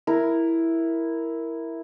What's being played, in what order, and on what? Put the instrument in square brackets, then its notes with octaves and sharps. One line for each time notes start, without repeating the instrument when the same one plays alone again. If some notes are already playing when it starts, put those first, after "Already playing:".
[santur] E4 A#4